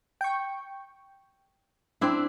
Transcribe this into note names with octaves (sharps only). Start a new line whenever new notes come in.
G5 C#6
C4 D4 E4